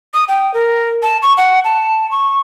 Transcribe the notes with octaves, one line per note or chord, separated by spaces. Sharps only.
D#6
G5
A#4
A5
C#6
F#5
A5
C#6